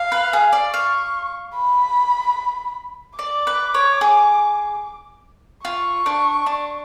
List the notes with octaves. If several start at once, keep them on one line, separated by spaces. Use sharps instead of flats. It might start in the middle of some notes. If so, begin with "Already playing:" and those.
Already playing: F5
B4
G#4
D5
F5 C#6
B5
D5 D6
B4
C#5
G#4
F4 C#6
D4
D4